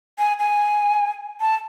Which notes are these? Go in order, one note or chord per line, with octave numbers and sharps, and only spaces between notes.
G#5
G#5
A5